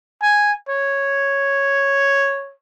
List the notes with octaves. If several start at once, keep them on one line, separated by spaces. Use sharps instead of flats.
G#5
C#5